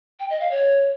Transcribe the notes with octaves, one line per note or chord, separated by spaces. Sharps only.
G5
D#5
F5
C#5